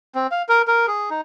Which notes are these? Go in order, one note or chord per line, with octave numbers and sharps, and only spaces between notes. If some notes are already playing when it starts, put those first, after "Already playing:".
C4
F5
A#4
A#4
G#4
D#4